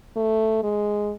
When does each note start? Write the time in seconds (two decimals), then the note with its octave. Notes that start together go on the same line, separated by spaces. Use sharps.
0.17 A3
0.63 G#3